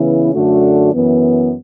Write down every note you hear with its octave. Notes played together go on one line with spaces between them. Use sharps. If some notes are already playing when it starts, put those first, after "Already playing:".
Already playing: C#3 E3 B3 E4
F#2 D3 A3 D4 F#4
F#2 E3 B3